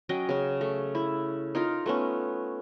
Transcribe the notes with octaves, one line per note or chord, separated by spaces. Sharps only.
F#3 C#4 D#5 G5
C#3 C#4
A3
E4
D#4 F4 A#4
A3 B3 C#4